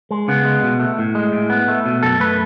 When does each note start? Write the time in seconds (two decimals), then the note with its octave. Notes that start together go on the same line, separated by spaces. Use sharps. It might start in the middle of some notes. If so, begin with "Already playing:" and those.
0.11 G#3
0.28 C#3 B3
0.45 G#3
0.63 B2
0.80 A3
0.98 A2
1.15 G#3
1.33 A2
1.50 B3
1.68 A3
1.86 B2
2.03 F#2 A4
2.20 A3 B4